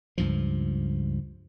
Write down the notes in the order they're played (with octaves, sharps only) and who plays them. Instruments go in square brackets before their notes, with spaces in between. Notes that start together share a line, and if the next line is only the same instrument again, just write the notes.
[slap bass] C#2 G2 F3